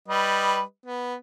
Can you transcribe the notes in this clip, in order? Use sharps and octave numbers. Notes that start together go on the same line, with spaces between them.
G3 B4 D#5
B3